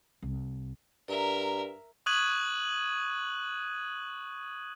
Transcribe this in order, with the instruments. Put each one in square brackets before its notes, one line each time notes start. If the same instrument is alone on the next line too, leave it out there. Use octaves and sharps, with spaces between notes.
[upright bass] C2
[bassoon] G2 [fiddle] A#4 E5 [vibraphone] D5 A#5
[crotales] C#6 D#6 F#6 G#6 D#7 F#7